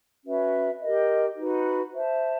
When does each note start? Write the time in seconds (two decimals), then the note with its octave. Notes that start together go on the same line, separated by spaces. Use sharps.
0.25 C#4 F#4 B4 E5
0.81 G4 A#4 D#5
1.36 D#4 F#4 B4
1.93 C5 E5 A5